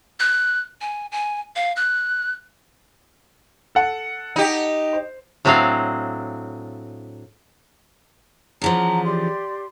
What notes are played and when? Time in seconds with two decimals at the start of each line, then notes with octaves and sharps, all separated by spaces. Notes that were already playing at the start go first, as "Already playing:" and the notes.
0.20 F#6
0.81 G#5
1.12 G#5
1.56 F5
1.76 F#6
3.75 A4 F#5
4.36 D#4 G4
4.93 C5
5.45 A2 F#3 C4 D4 D#5 F5
8.62 C#3 E3 F3 F#5 A5 A#5
9.04 G4 D5 C6